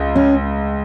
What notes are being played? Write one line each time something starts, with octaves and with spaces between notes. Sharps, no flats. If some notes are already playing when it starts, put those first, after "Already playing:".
Already playing: C#2
C#4